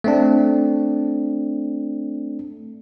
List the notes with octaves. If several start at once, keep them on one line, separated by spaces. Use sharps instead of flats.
A3 C4 D4